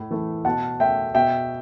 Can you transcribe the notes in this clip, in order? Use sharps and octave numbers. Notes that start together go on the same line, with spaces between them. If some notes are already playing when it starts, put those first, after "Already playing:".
Already playing: A2
E3 A3
B2 F#5 A5
A3 E5 G5
B2 E5 G5